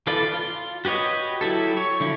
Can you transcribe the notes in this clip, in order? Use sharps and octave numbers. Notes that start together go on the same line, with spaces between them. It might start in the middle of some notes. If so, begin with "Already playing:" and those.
E3 F4 A4 B4 D5
F4
F#4 G4 B4 C#5 D#5
F#3 E4 G4 A4
C#5
D3 F3 E4